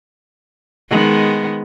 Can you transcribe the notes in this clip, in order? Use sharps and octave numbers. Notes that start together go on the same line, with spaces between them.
D#3 G#3 B3